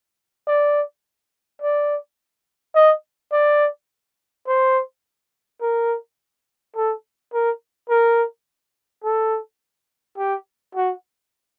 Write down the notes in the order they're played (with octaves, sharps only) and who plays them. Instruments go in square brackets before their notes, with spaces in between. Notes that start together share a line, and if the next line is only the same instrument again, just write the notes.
[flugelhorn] D5
D5
D#5
D5
C5
A#4
A4
A#4
A#4
A4
G4
F#4